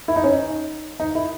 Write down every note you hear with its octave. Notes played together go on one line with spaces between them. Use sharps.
E4
D#4
C#4
D#4
D#4
E4